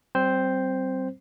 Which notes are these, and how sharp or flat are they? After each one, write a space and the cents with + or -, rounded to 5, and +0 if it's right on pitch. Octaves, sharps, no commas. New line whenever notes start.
G3 -35 C4 +0 C5 +0